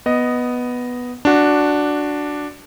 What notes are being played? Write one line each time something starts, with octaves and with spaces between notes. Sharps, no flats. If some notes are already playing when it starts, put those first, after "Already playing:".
B3 D#5
D4 F#4